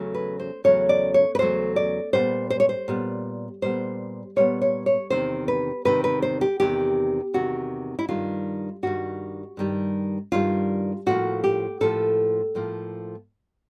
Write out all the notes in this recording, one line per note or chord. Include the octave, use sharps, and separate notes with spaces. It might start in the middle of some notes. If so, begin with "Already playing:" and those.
Already playing: E2 C#3 F#3 A3
B4
C5
E2 C#3 F#3 A3 C#5
D5
C#5
B4
E2 C#3 F#3 A3 C5
D5
A#2 G3 B3 C5
C5
C#5
C5
A#2 G3 B3
A#2 G3 B3 C5
A#2 G3 B3 C#5
C#5
C#5
E2 C3 D#3 C5
B4
E2 C3 D#3 B4
B4
C5
G4
E2 C3 D#3 G4
E2 C3 D#3 F#4
E4
G2 D#3 G3 F4
G2 D#3 G3 F#4
G2 D#3 G3
G2 D#3 G3 F4
A2 F3 A#3 F#4
G4
A2 F3 A#3 A4
A2 F3 A#3